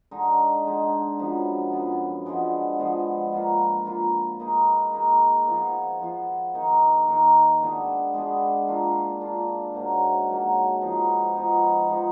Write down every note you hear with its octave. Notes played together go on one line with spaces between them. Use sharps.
D3 G#3 D#4
D3 G#3 D#4
F#2 F3 B3
F#2 F3 B3
D3 F3 G#3 B3
D3 F3 G#3 B3
A#3 F4 B4
A#3 F4 B4
A#3 D#4 G#4 B4
A#3 D#4 G#4 B4
F3 B3 F4
F3 B3 F4
D#3 A#3 D#4
D#3 A#3 D#4
G#3 B3 D4 G#4
G#3 B3 D4 G#4
A#3 D4 F4
A#3 D4 F4
G#2 F#3 A#3
G#2 F#3 A#3
F3 B3 D#4
F3 B3 D#4
F3 G#3 D#4